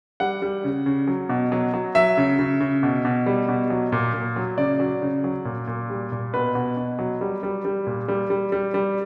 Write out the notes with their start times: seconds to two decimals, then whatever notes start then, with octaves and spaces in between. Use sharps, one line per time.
0.20 G3 F#5
0.42 G3
0.64 C#3
0.86 C#3
1.07 F#3
1.29 B2
1.52 F#3
1.74 F#3
1.95 F#3 E5
2.17 C#3
2.39 C#3
2.60 C#3
2.83 B2
3.05 B2
3.26 G3
3.49 B2
3.70 F#3
3.92 A#2
4.14 A#2
4.36 F#3
4.58 C#3 D5
4.80 F#3
5.02 C#3
5.24 F#3
5.45 A#2
5.67 A#2
5.90 G3
6.12 A#2
6.34 B2 B4
6.55 B2
6.77 B2
6.99 F#3
7.21 G3
7.43 G3
7.65 G3
7.87 A#2
8.08 G3
8.30 G3
8.52 G3
8.74 G3